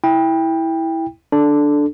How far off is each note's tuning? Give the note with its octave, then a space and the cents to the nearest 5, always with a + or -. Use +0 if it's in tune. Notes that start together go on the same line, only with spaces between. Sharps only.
E4 -10 G5 +20
D4 +0 A4 -10